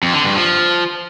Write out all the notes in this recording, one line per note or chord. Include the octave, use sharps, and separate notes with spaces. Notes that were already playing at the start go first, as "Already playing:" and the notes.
F2
D3
G2
F3